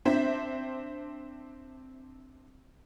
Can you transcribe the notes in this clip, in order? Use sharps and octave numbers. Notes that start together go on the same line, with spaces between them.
C4 D4 C5 E5